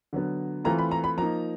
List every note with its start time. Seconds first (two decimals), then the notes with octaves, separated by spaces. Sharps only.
0.13 D3 F#3 B3
0.64 E3 A3 C4 F4 A#5
0.79 B5
0.91 A#5
1.04 B5
1.17 F3 A#3 D#4 A#5